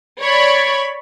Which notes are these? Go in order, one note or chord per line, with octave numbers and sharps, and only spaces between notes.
C#5 D5 B5